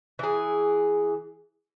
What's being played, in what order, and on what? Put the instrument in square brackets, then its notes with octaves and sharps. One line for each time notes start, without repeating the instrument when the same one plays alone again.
[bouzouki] E3 G#4